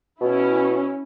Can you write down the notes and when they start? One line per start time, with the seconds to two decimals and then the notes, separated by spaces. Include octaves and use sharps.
0.21 B2 C#4 E4